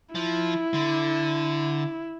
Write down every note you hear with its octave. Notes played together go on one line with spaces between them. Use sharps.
F3 E4
D3